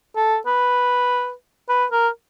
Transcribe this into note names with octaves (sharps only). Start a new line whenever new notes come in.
A4
B4
B4
A#4